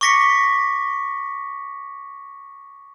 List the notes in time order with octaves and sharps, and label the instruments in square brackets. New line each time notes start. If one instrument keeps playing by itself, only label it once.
[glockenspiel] C#6 D6 A#6 B6 C#7